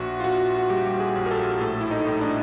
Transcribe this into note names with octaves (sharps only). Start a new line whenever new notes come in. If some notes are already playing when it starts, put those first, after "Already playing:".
Already playing: A#1 F#4
F4
A#1 F#4
F#4
G3 G4
G#4
A#1
A#4
A4
A2 A4
E4
D#4
A2
D4